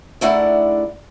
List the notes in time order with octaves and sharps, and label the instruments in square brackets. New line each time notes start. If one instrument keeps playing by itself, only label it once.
[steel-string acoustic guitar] G#2 D3 A3 E4 D5 F#5